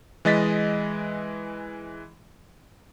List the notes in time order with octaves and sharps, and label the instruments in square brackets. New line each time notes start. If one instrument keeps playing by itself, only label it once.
[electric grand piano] E3 G#3 D#5 A6 B6